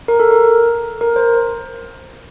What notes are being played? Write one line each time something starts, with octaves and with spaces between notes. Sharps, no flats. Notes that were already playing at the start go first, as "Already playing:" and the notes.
A#4
A4
A#4
A#4
C5